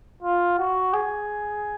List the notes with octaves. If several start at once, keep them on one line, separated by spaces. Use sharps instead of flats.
F4
F#4
G#4